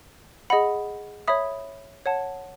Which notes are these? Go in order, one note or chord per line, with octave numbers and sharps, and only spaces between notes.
G#4 D#5 F#5 B5
C#5 E5 B5 D#6
C#5 F#5 A5